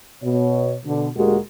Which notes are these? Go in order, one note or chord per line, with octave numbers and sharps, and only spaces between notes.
B2 C#5
B2 D3
D2 A#2 G#3 F#4 G4 A#4